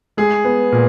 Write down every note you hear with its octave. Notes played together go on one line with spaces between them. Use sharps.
G#3 G#4
B3
A#2